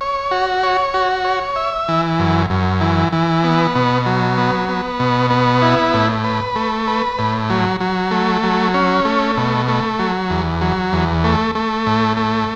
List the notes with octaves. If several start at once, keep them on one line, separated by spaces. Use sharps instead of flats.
C#5
F#4
C#5
F#4
C#5
E5
E3
F#2
F#2
E3
E3
B3
B2
F#3
B3
B3
B2
B3
E4
A2
B4
A3
B4
A2
F#3
F#3
A3
F#3
C#4
A3
B2
A3
F#3
E2
F#3
E2
A3
A3
A2
A3